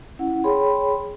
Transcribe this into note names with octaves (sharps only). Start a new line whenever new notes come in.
C#4 E4 F#5
G#4 C#5 G5 B5 C6